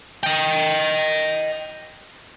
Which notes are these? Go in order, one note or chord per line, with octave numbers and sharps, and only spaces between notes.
D#5 G5